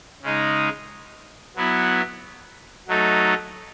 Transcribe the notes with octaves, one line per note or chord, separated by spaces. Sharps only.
C#3 G#3 D#4
F#3 B3 E4
F#3 A3 D#4 A4